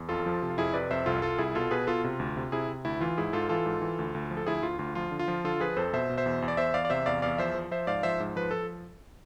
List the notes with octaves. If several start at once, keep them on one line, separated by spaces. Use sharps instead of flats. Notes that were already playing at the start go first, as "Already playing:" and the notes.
Already playing: E2
F2 F4 A4
F3
C3
F4
F2 E4 G#4
C3 B4 D5
F2 C5 E5
C2 F4 A4
C2 F4 A4
C2 E4 G#4
B2 F4 A4
B2 G#4 B4
B2 F4 A4
C3 F4
D2
C3
C3 E4 G#4
C3
D2 E4
E3 F4
G#2 E4 G#4
G#2 F4 A4
E3 F4 A4
G#2
E3
D2
D2
F3
A4
D2 E4 G#4
D2 F4
D2 F4
F3 F4
D3
F4
F3
D3 F4 A4
F3 G#4 B4
F2 A4 C5
B2 C5 E5
B2
C5 E5
E2
E2
D5
E2 C5 E5
E2 D5 F5
D5
C3 C5 E5
E2 D5 F5
E2 D5 F5
F3 C5 E5
F3
F3 C5 E5
G#2 D5 F5
F3 C5 E5
G#2
F3 B4
F3 A4